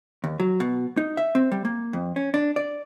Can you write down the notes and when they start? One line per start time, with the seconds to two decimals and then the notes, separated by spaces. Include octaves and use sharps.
0.24 D#2
0.40 F#3
0.60 B2
0.97 D#4
1.17 E5
1.35 C4
1.52 G3
1.65 A#3
1.93 F2
2.16 C#4
2.34 D4
2.56 D5